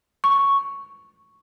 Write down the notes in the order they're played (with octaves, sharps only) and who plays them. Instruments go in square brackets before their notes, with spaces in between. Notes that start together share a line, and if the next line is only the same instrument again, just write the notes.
[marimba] C#6